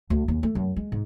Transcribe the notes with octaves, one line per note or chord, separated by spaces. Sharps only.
D2
D#2
A3
F#2
G#3
G#2